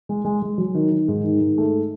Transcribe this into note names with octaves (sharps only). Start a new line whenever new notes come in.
G#3
G#3
G#3
F#3
D#3
D#3
G#2
D#3
G#2
A3